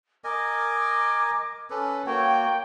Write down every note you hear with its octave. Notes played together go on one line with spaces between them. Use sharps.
A#4 D#5 G#5 D6
C#4 A4 B4
A#3 F#4 C#5 G5